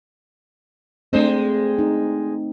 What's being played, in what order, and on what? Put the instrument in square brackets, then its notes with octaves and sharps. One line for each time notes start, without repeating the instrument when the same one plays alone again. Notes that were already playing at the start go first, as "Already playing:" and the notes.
[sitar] G#3 D4 C5 [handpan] A3 C4
[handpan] D#4